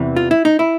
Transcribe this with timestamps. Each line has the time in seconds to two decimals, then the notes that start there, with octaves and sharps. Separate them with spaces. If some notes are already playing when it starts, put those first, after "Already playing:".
Already playing: E2 C3 E3
0.16 F4
0.31 E4
0.45 D#4
0.59 E4